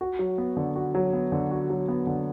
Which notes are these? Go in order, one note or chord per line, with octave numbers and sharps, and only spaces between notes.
F#4
F#3
B3
D3
F#4
F#3
B3
D3
F#4
F#3
B3
D3